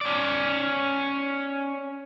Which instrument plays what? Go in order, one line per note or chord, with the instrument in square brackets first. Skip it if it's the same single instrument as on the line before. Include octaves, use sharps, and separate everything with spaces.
[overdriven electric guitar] C#4 D5